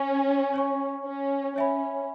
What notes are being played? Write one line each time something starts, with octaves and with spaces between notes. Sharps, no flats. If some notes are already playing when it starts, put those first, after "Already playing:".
Already playing: C#4 C#5 G#5 C#6
C#5 G#5 C#6
C#4
C#4 C#5 E5 G#5 B5